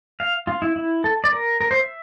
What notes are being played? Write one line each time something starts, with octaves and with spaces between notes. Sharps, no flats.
F5
F4
E4
E4
A4
D5
A#4
A#4
C5
E5